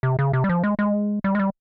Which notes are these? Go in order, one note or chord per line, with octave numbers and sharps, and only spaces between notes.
C3
C#3
C3
G3
F3
G#3
G#3
G3
G#3
G3